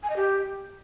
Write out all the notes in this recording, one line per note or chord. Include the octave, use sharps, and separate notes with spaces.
G#5
D#5
G4